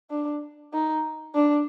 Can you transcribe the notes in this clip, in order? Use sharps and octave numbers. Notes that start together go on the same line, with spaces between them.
D4
D#4
D4